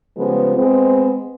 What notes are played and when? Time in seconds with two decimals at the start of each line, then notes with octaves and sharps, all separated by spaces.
0.18 C#3 F3 G3 G#3 B3
0.57 G#3 B3 C4